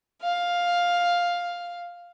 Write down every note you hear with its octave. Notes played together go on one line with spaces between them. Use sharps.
F5